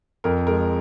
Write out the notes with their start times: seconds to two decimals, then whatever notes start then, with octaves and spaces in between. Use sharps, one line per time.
0.24 F2 A#4
0.47 G#3 A#4